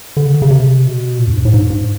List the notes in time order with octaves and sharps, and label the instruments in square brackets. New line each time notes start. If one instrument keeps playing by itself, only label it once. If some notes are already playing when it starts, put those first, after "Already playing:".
[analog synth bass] D3
C#3
D3
C#3
C3
B2
A#2
E2
G#2
G2
A2
G#2
G#2